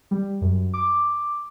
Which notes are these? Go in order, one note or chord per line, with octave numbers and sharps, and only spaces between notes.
G3
F#2
D6